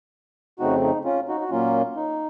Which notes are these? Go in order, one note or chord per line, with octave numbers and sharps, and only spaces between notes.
F2 C#3 A3 C4 D#4 F#4
D#4
C#4 F4
D#4 F#4
F#4
A#2 F#3 A#3 C#4 F4
D#4